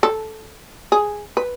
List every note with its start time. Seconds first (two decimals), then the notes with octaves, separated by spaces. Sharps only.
0.03 A4
0.92 G#4
1.37 B4